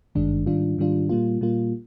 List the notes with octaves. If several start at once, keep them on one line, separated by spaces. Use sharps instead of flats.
G#1 G2 D#3 G#3 D4
G#2 D#3 G3 D4 F4
G#2 D#3 G3 D4 F4
A#2 G3 A#3 F4
A#2 G3 A#3 F4